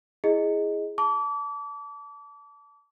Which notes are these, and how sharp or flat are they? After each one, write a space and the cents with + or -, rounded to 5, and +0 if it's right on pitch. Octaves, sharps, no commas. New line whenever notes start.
E4 +0 G#4 +0 D#5 +0
A5 +0 D6 -35